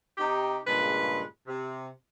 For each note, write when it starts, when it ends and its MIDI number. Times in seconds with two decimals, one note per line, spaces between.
0.18 0.58 48
0.18 0.58 63
0.18 0.58 67
0.66 1.21 43
0.66 1.21 46
0.66 1.21 49
0.66 1.21 56
0.66 1.21 71
1.47 1.88 48